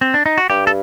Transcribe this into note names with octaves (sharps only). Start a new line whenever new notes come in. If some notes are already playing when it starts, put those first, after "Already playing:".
C4
D4
D#4
F#4
G2 G4
A4